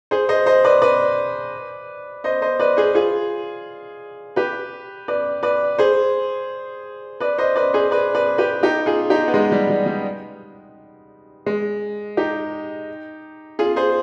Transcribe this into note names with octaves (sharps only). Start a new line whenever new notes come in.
G#4 C5
C5 D#5
C5 D#5
B4 D5
B4 D5
C5 D#5
C5 D#5
B4 D5
G#4 C5
F4 G#4
G4 B4
B4 D5
B4 D5
G#4 C5
B4 D5
C5 D#5
B4 D5
G#4 C5
B4 D5
B4 D5
G4 B4
D#4 G4
F4 G#4
D#4 G4
B3
G#3
G3
G3
G3
G#3
D#4 G4
F4 G#4
G#4 C5